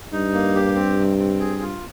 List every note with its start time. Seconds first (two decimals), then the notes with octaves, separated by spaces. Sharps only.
0.13 G2 D#4
0.34 A#3
0.55 G4
0.76 C4
0.97 C3
1.19 C4
1.40 G#4
1.61 F4